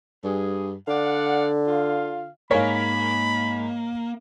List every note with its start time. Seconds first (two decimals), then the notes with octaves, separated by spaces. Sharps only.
0.24 G2 G#4
0.88 D3 D5 F5 F#5
1.66 F4 F5
2.51 G#2 A#3 A#4 C#5 F5 G#5 B5 B6